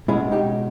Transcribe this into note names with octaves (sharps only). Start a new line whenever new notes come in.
B2 G#3 C#4 E4 G#4
D#4 G4